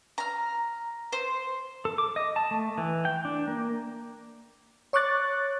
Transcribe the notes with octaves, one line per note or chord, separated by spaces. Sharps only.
A#5 F6
C5
A4
D6
D#5
A5
A3
E3
G5
D4
A#3
C#5 C#6 D6 F#6 A6